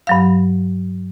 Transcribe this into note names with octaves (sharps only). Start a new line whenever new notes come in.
G2 F#3 F5